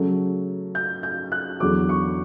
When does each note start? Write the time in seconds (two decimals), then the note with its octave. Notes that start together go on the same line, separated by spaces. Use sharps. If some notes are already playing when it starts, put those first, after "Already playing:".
Already playing: C#3 F#3 A3
0.75 G6
1.03 G6
1.32 F#6
1.60 E2 D3 F#3 D6
1.89 C#6